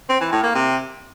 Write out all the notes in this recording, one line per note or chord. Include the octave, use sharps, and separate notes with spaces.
C4
E3
A2
A#3
C3